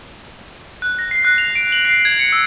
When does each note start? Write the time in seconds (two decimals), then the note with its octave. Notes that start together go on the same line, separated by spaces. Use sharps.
0.82 F#6
0.99 A#6
1.11 C7
1.25 F#6
1.38 F7
1.55 D7
1.72 F#7
1.85 C7
2.05 G#6
2.19 C#7
2.32 E6